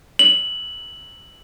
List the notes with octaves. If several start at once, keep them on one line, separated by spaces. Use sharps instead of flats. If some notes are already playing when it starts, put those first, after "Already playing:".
F#7